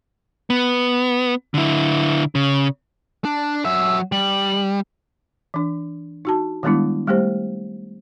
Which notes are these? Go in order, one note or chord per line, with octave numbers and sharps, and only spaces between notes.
B3
D3 E4
C#3
D4
F#3 E5 E6
G3 F#7
E3 D4
D#4 F#4 A5
D#3 G3 G#3 B3 D4 E4
G3 A3 G4 C5